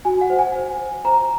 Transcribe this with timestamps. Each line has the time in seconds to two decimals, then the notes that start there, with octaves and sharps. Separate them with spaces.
0.05 F#4 G#5
0.21 F#5
0.30 C5
0.39 G#5
0.55 C5
0.79 C5
1.05 C5 A#5